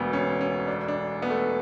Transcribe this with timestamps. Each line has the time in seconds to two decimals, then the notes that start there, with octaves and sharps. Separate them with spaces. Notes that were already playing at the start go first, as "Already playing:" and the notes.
Already playing: E1 D2 B3
0.13 C#4
0.41 C#4
0.67 D4
0.88 D4
1.22 B3
1.30 A3